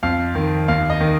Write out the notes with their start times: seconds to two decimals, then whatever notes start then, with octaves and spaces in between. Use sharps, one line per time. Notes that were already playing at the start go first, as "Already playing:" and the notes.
0.03 F2 F5
0.35 D#3
0.68 D#2 F5
0.90 D#5
1.01 D#3